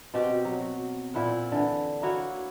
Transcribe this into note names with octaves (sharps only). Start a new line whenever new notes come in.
B2 C4 F#4 G4
F#3
F#4
A#2 E4 C5 F#5
D3 E3
A#3 E4 F#4 C#5